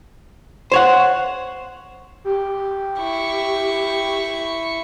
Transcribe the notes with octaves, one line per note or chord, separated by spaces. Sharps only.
C5 C#5 F#5
G4
E4 C#6